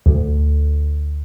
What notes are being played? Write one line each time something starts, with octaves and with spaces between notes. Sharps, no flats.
D2